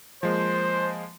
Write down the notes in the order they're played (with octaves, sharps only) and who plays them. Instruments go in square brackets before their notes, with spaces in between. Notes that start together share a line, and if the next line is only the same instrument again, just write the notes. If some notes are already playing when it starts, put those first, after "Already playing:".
[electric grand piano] F3 G#3 A#3 [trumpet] C5